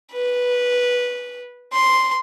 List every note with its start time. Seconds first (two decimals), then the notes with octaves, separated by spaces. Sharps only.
0.13 B4
1.72 C6